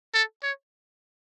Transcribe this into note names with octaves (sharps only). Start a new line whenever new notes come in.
A4
C#5